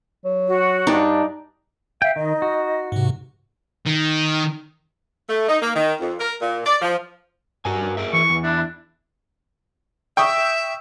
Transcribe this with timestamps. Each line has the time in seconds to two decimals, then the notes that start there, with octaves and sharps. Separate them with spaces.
0.25 F#3
0.47 F#4
0.87 G2 D4 D#4 D5
2.02 E5 F5 G5
2.16 D#3 D#4 D#5
2.42 F#4
2.92 G#2 C3
3.86 D#3
5.28 A3
5.48 D#4
5.62 A#3
5.75 D#3
6.00 F2
6.19 A#4
6.40 A#2
6.66 D5
6.82 F3
7.65 G2 F#4 A#4 G#5
7.97 G#4 A#4 E5
8.13 E3 C#6
8.30 E2
8.44 D4 E4
10.17 E5 G5 C#6 D#6